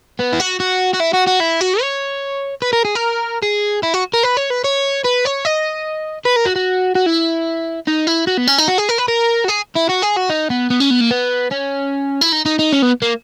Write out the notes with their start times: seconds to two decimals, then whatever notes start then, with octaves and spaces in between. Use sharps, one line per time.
0.19 B3
0.33 E4
0.40 F#4
0.60 F#4
0.94 F#4
1.00 E4
1.14 F#4
1.27 F#4
1.40 E4
1.61 F#4
1.81 C#5
2.62 B4
2.73 A#4
2.85 G#4
2.95 A#4
3.42 G#4
3.83 E4
3.94 F#4
4.13 A#4
4.23 B4
4.37 C#5
4.50 B4
4.64 C#5
5.04 B4
5.25 C#5
5.45 D#5
6.25 B4
6.36 A#4
6.45 F#4
6.56 F#4
6.95 F#4
7.06 E4
7.87 D#4
8.07 E4
8.27 F#4
8.37 B3
8.47 C#4
8.58 D#4
8.68 F#4
8.78 G#4
8.89 A#4
8.98 B4
9.08 A#4
9.45 F#4
9.49 G#4
9.76 E4
9.90 F#4
10.03 G#4
10.17 F#4
10.30 D#4
10.50 B3
10.70 B3
10.80 C#4
10.90 B3
11.01 A#3
11.11 B3
11.51 C#4
12.21 E4
12.32 D#4
12.46 D#4
12.59 D#4
12.72 C#4
12.82 B3
13.02 A#3